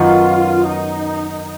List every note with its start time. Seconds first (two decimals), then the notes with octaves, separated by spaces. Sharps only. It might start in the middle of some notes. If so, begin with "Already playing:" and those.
Already playing: F#2 D#3 F#3 B3 F4
0.66 D#4